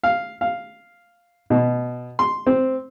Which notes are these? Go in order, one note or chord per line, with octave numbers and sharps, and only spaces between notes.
F5
F5
B2
C6
C4